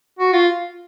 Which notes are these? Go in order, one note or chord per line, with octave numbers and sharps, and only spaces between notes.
F#4
F4